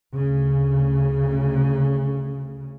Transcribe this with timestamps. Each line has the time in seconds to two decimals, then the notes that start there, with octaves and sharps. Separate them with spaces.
0.15 D2 C#3